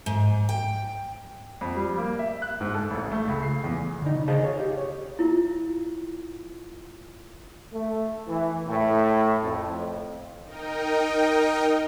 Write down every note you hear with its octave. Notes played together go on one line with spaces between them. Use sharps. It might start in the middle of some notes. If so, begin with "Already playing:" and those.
G#2
G5
F2
G3
A#3
E5
F#6
G#2
A4
A1
A3
C#2
C7
E2
D3 D#4
C#3
G#4 C5 D#5 F5 G#5 A5
G#4 C#5 F5
G4
C#5
E4 F4
A3
E3
A2
F2
D#4 A#4 D#5 G5